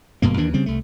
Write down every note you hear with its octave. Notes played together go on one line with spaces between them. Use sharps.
G#1 G2 B2 A#3
D#2 D#3 E3 D4
C#3 G3 C4
C2 A3